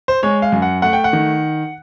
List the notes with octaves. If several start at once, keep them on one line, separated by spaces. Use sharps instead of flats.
C5
G#3 C#5
F5
F#2
F#5
A3 F#5
G5
F#5
D#3